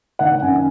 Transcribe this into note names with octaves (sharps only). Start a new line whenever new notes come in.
D#3 F#5
F#2 G#5